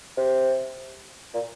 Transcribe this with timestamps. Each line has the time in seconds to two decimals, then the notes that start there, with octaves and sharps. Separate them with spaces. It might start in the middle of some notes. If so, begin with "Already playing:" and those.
0.17 C3
1.34 A#2